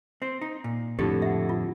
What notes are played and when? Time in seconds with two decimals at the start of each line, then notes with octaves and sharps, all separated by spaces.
0.22 C4 C5
0.41 D#4
0.64 A#2
0.99 F2 A2 D3 G4 A4
1.22 E5 F#5
1.49 F4